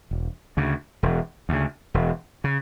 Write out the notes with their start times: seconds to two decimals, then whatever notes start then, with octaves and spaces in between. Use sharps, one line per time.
0.11 E1
0.57 D2 C#3
1.03 E1
1.49 D2 C#3
1.94 E1
2.44 C#3